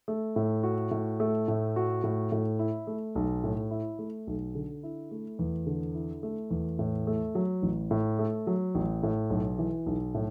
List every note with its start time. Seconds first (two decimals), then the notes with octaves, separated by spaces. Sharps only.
0.08 A3
0.36 A2
0.63 F#4
0.91 A2
1.20 A3
1.48 A2
1.76 F#4
2.04 A2
2.32 A2
2.59 E4
2.87 A3
3.15 B1
3.44 A2
3.71 E4
3.99 A3
4.27 B1
4.55 D3
4.83 E4
5.11 A3
5.39 E2
5.67 D3
5.95 E4
6.23 A3
6.51 E2
6.79 A2
7.07 A3
7.35 F#3
7.62 A1
7.91 A2
8.19 A3
8.47 F#3
8.75 A1
9.03 A2
9.30 B1
9.59 E3
9.86 B1
10.15 A2